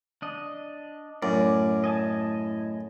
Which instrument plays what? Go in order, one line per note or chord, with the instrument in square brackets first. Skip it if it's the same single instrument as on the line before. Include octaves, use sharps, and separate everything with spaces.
[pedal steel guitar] D4 D#5
[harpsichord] F#2 [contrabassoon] A2 [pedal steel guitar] C#4 D5
[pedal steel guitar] D#5 G#5 A5